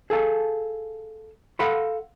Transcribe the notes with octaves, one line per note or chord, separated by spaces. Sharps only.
G#4 A4 F5 A5
A4 F5 F#5 B5 C6